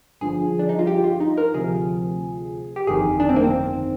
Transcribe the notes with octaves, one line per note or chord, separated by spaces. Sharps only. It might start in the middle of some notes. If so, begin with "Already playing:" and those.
G1 G2 D3 F3 G#4
D4
D#4
F4
G4
F4
D#4
A#4
D2 C3 F3 G#4
G4
G1 F2 D#3 G#4
D4
C4
A#3
C4